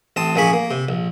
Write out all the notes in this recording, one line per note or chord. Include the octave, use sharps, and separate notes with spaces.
A1 C4 A5 D#6
A#1 A#3 C#4 G#4 B5 C#6
A#3
C3
A#1